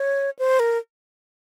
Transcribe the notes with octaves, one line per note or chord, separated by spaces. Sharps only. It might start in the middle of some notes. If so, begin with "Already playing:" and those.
Already playing: C#5
C5
A#4